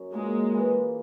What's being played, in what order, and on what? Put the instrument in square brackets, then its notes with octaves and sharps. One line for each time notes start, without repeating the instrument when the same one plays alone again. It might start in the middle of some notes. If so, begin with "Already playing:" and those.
Already playing: [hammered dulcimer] F#2
[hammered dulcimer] A#2 A#3 D#4 [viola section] G#3
[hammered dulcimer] E3 A#3